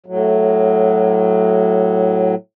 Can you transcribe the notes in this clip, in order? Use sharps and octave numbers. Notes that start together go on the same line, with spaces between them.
A2 F#3